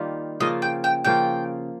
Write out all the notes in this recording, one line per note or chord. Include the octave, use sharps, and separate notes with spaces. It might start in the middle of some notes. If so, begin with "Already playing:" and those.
Already playing: D#3 G3 A#3 F4
C#3 F3 A#3 F4 D#5
G5
G5
C#3 F3 A#3 F4 G5